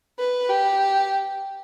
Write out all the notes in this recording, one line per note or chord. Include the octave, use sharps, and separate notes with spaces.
B4
G4